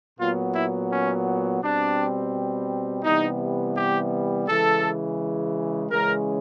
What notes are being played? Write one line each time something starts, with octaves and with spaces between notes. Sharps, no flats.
A#2 F#3 B3 F4
E4
C#4
B2 G3 C4 D4
C3 E3 G3 B3 D#4
G4
C#3 E3 G#3 A4
C#3 E3 G#3 C#4 A#4